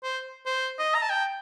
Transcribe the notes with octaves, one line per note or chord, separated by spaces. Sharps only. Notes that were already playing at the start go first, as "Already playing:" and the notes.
C5
C5
D#5
A#5
A5
G5